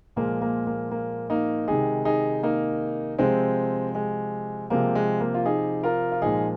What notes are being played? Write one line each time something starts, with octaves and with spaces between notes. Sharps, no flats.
A#2 F3 G#3 A#3
A#3
A#3
A#3
A#3 D#4
C3 D#3 G#3 D#4 G#4
D#4 G#4
A#3 D#4
C3 F3 G#3 C4
G#3
C3 F3 G#3 A#3
G#3
A#3
F4
D#4 G#4
F4 A#4
F4
A#2 F3 G#3 D#4 G#4